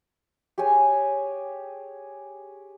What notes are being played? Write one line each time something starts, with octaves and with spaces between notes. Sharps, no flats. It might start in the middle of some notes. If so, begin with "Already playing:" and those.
G4 G#4 C#5 G#5